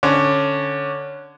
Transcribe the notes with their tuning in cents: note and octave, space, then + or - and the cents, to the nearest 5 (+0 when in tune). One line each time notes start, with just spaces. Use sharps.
D3 +0 C#4 +0